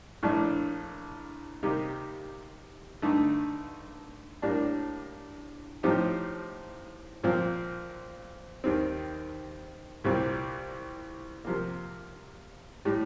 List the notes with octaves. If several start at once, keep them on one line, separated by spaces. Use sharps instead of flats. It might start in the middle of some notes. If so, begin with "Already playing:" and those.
A#1 A2 A3 D4
C3 G3 A#3 D#4 G4
G2 D3 A3 D#4
A2 G3 A#3 D4
A2 F3 C4 D#4 G4
A#2 F3 C4
D#2 D#3 G3 C4
C2 A#2 G3 C4
C3 F3 A#3
A2 G3